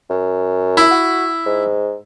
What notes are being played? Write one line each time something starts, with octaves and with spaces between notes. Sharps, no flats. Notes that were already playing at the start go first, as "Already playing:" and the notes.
F#2
E4
F#4
G#2